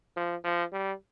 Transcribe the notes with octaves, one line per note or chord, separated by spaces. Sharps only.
F3
F3
G3